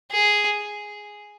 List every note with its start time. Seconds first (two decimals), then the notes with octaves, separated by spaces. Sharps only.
0.12 G#4